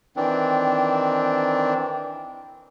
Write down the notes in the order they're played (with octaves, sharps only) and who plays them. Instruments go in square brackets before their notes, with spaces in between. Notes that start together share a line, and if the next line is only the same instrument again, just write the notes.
[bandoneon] D#3 E3 C4 D4